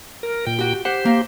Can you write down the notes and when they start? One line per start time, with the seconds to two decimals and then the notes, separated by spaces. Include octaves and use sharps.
0.23 A#4
0.47 A#2 G5
0.59 F#4 G4
0.85 G4 C5 F#5
1.05 A#3